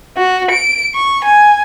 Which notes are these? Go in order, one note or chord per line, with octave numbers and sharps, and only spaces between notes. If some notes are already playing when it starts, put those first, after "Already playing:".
F#4
D7
C#6
G#5